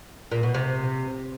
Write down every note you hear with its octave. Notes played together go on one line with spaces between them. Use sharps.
A#2
B2
C3